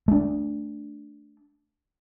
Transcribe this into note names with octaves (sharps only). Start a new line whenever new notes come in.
A3 D4